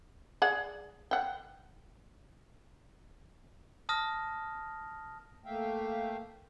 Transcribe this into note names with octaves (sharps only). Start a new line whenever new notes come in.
G#4 D5 F#5
F#5 G5
A5 D#6 F6 A#6
A3 A#3 E5 F5 G5